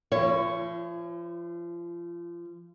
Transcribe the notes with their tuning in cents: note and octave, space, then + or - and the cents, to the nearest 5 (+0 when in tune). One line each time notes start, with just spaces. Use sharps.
F3 -30 E4 +45 C#5 +0